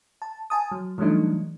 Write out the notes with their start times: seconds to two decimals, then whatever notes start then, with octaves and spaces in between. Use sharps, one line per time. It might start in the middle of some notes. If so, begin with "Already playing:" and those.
0.22 A5
0.50 G#5 A5 D#6
0.72 F#3
0.98 E3 F#3 G3 A3 D4 D#4